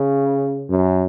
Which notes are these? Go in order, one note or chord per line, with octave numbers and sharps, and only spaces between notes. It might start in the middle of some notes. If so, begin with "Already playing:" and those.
Already playing: C#3
F#2